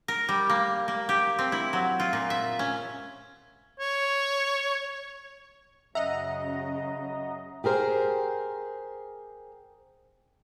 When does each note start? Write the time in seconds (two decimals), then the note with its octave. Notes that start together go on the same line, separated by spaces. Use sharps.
0.08 A#4
0.29 G3
0.49 A#3
0.88 A#3
1.09 G4
1.39 C4
1.52 E4
1.73 F#3
2.00 F4
2.13 A#2
2.30 E5
2.59 C#4
3.80 C#5
5.95 F#2 C#3 D#5 E5 F#5 A#5
7.64 G4 G#4 A#4 C5